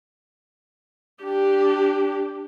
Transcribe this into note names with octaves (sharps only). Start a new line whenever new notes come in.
D4 G4